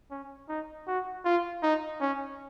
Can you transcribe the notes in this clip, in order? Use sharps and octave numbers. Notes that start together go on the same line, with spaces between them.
C#4
D#4
F#4
F4
D#4
C#4